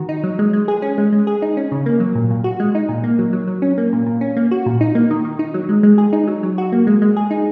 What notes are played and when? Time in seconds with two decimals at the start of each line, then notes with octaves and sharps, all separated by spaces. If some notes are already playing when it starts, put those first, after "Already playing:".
Already playing: D#3 F#4
0.09 D#4
0.24 F#3
0.39 G#3
0.53 G#3
0.68 G#4
0.82 C#4
0.98 G#3
1.12 G#3
1.27 G#4
1.42 D#4
1.57 C#4
1.72 C#3
1.86 A#3
2.00 F#3
2.15 A#2
2.30 A#2
2.44 F#4
2.60 G#3
2.75 D#4
2.89 A#2
3.04 A#3
3.19 F#3
3.33 F#3
3.48 F#3
3.62 C#4
3.78 A#3
3.93 A#2
4.06 A#2
4.21 C#4
4.37 A#3
4.51 F#4
4.66 A#2
4.81 D#4
4.95 A#3
5.11 D#3
5.25 D#3
5.39 D#4
5.54 F#3
5.69 G#3
5.83 G#3
5.98 G#4
6.13 D#4
6.27 F#3
6.43 F#3
6.58 F#4
6.72 A#3
6.87 G#3
7.02 G#3
7.17 G#4
7.31 D#4